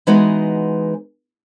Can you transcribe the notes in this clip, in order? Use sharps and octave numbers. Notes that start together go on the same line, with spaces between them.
E3 G#3 B3 D#4 F#4